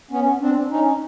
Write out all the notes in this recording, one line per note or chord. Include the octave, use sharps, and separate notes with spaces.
B3 C#4
C4 D4
C#4 D#4